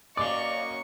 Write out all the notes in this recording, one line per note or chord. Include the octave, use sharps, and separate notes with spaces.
F#2 A#3 D5 D#5 F5 C#6 D6